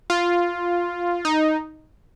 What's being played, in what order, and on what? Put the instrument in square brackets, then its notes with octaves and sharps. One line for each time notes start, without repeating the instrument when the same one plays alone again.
[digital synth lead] F4
D#4